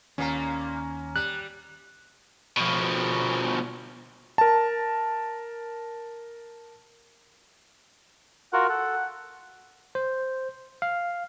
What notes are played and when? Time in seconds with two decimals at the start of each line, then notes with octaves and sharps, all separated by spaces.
0.18 D#2 A#2 A#3 C#4 A#5
1.16 G3 F#6
2.57 B2 F3
4.38 A#4 A5
8.53 F4 F#4 A#4 F#5
8.69 A4 F#5
9.95 C5
10.82 F5